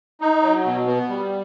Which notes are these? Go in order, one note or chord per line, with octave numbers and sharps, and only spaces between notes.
D#4
F#3
B2
B3
G3